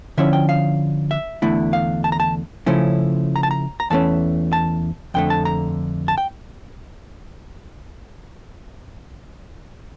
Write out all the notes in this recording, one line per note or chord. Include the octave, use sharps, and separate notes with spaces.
D3 F3 C#4 E4 E5
G5
F5
E5
E2 D3 A3 E4
F5
A5
A#5
A5
C#3 F3 A3 C#4 E4
A#5
A5
A#5
A#5
E2 E3 A3 C#4 A5
A5
F2 D3 A3 G5
A5
A#5
A5
G5